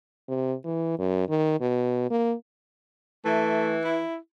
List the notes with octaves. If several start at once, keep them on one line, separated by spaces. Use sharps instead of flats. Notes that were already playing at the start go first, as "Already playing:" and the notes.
C3
E3
F#2
D#3
B2
A#3
E3 A3
E4